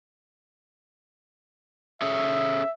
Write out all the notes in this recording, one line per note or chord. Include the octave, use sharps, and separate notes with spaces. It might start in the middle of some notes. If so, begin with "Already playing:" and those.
C#4 G#4 A4 E5